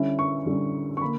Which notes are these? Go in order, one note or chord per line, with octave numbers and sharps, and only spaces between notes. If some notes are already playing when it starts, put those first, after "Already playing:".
Already playing: D3 G3 C#4 E4
C#6
D3 G3 C#4 E4
C#6
D3 A#3 D4 B5